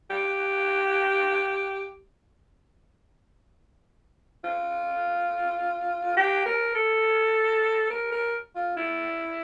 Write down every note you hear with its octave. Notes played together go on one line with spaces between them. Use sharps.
G4
F4
G4
A#4
A4
A#4
A#4
F4
E4